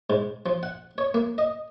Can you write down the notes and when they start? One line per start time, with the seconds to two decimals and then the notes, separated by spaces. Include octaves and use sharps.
0.10 G#2
0.46 F3
0.63 F#5
0.98 C#5
1.14 A#3
1.38 D#5